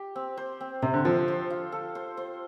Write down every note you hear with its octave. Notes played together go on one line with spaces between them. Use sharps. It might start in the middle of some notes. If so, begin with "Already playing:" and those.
Already playing: G4
C4
C5
C4
C3 C5
D3
F3 A4
C5
F4
A4
C5
C5